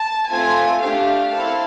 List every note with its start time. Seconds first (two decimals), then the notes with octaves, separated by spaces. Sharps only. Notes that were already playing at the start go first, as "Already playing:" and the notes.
Already playing: A5
0.29 A3 C4 F4 G#5
0.80 A3 D4 G4 F5
1.31 C4 E4 A4